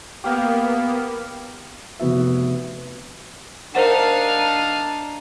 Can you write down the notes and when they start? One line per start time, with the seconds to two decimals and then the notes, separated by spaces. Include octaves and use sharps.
0.24 A#3 B3 G4 F5
1.99 F1 B3 F#4 E5
3.75 D4 D#4 A#4 C5 F5 F#5 A5